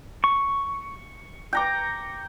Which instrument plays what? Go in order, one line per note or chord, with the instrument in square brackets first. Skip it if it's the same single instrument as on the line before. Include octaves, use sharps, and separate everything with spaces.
[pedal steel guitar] C#6
[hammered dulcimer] G5 A#5 D6